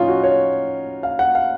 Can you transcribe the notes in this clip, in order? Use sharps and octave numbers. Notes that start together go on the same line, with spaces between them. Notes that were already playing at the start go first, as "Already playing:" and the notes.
Already playing: A2 F3 C#4 D#4 F4
F#4
C#5
F5
F#5
F5